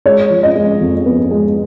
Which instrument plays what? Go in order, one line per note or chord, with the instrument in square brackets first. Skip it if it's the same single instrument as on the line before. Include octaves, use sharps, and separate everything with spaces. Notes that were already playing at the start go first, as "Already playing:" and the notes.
[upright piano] G#3 C#5
F3
D#5
G#3
F2
B3
G#3